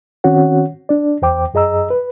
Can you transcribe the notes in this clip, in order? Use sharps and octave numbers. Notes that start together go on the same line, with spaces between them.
D#3 C4 C#4 F#4 C#5 F#5
D4 D5
E2 C5 G5 D6
F#2 G#4 D#5 A#5 E6
B4